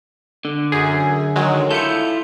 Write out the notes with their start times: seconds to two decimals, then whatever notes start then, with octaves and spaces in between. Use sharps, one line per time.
0.45 D3
0.72 F#2 G#4
1.36 D#3 F#3 G#3
1.71 E4 F4 A4 G6 C#7